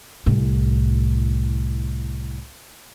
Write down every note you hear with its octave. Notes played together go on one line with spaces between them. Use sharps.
C2 A2